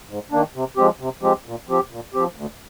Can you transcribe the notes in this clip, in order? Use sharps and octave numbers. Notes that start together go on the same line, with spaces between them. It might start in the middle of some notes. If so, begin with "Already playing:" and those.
G#2
D#3 A#3 D4
C3
F3 G#3 C4 G4
C3
F3 G#3 C4 G4
A#2
F3 C4 G4
A#2
F3 C4 G4
D2